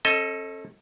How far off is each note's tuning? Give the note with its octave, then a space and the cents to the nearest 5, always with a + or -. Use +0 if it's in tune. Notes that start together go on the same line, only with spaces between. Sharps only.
C#4 -40 A4 +0 D#5 +15